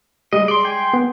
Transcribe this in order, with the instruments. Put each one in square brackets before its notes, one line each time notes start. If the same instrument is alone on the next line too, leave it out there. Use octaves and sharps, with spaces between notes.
[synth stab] G3 G#3 [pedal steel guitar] D#5
[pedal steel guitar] D5 C6
G5 G#5 C6
[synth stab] B3